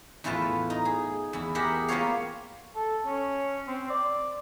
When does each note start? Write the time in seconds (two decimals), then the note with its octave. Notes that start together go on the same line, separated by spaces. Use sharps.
0.24 E2 A2 E4 F4 B4 A5
0.70 D#4
0.85 G#4
1.33 E2 E4
1.55 G4 G#4 A#4 E5 F#5
1.88 A#3 B3 F4 G4 C#5 F5
2.75 A4
3.06 C#4
3.68 C4
3.90 D5